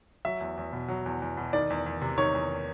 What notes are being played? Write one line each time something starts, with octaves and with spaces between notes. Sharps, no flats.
F#3 E5
E2
E2
B2
F#3
E2
E2
B2
D#3 D5
E2
E2
C3
D#3 C#5
E2